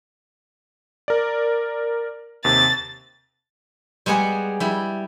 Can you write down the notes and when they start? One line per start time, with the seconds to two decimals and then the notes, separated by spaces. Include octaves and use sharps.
1.08 A#4 D5
2.45 D#2 C3 A6
4.06 G3 G#3 B3 G#4 F#5
4.60 G3 E4